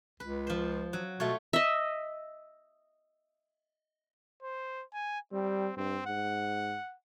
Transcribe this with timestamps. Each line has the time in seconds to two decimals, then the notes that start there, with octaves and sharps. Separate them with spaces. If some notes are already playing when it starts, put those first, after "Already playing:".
0.20 C#2 B4
0.47 F3 C5
0.93 F#3
1.20 B2 A3 F4 C#5
1.53 D#5 E5
4.42 C5
4.93 G#5
5.33 G3 C4
5.77 G2 C4
6.06 G#2 F#5